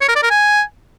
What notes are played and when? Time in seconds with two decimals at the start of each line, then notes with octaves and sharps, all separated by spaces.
0.01 C#5
0.08 A#4
0.16 D5
0.23 A#4
0.30 G#5